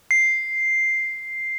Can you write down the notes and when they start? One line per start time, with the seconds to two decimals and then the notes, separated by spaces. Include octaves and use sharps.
0.11 C7